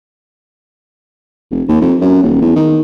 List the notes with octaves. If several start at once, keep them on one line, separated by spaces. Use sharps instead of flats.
F1
D#2
F2
F#2
D#1
E2
D#3